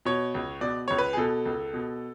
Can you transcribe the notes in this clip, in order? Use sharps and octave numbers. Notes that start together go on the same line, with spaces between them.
B2 C#5
C#2
B2 D5
C#2 C#5
B4
G#4
B2 A4
C#2
B2